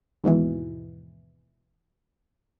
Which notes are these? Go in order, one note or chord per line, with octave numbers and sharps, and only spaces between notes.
D#2 G#2 B2 E3